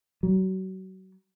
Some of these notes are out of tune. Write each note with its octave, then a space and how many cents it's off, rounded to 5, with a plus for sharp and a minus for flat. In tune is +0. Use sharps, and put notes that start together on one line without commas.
F#3 +30